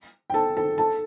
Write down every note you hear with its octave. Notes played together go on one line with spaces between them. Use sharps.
G5
A4 A5
A4 A5
A4 A5